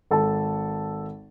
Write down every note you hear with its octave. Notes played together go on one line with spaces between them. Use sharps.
G#1 A4 A5